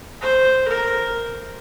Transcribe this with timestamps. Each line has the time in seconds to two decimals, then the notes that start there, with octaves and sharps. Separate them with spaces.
0.21 C5
0.68 A#4